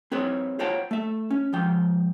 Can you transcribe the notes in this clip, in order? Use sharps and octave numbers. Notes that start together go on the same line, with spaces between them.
C4 G#4 B4 C#5
F4 C5 C#5 F#5 G5 A5
A3 E5
C#4
G#2 F3 G5